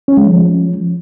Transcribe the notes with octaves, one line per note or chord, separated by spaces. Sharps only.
C#4
G#3
F3